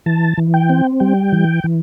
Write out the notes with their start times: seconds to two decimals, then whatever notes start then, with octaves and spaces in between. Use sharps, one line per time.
0.06 E3 A5
0.38 E3
0.54 G5
0.69 C4
1.00 G3 G5
1.32 E3
1.64 E3